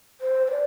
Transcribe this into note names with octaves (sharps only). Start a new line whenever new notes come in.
C5
C5
D5